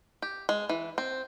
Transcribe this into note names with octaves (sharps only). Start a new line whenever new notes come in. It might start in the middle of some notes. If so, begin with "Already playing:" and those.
G4
G#3
E3
C4